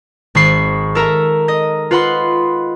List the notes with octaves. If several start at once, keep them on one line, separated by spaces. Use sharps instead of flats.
G#1 B5 C#6 C7
A4 A#4 E5 A#5
D#5
F4 B4 F#5 B5 C6